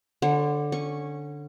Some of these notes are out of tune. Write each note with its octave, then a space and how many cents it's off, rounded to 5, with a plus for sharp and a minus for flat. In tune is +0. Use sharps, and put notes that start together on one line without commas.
D3 +0 C#5 -40
C#4 -15 C#6 +0